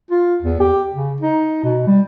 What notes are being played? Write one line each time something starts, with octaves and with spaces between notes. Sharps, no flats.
F4
E2
G4
C#3
D#4
B2
G3